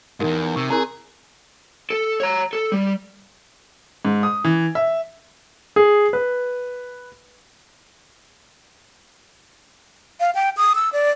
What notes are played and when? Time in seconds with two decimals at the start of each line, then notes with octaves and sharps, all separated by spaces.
0.20 E2 G#2 D#4 G4 A#4
0.56 C3 C#6 E6 D#7
0.70 C4 E4 G#4 A#4 A#5
1.90 A4
2.20 C#5 A#5
2.53 A4
2.72 G3
4.05 G#2
4.23 D#6
4.44 E3
4.75 E5
5.76 G#4
6.13 B4
10.20 F5
10.35 G5
10.57 D#6
10.75 E6
10.93 D5